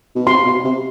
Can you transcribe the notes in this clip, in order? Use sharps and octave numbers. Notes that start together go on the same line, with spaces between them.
B2
C3 C6
B2
C3